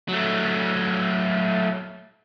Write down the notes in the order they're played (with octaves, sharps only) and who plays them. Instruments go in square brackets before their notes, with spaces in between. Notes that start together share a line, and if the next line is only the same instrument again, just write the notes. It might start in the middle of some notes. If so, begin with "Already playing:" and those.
[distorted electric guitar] F#3 A3